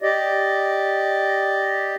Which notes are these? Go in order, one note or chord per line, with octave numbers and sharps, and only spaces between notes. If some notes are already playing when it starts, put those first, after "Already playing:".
G4 D5 D#5